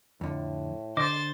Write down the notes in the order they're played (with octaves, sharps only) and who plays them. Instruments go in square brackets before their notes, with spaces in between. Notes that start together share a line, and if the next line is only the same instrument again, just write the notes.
[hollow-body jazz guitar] F2 D3 [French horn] A2
[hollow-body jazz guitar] D3 [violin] C5 A6 [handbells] D#5 D6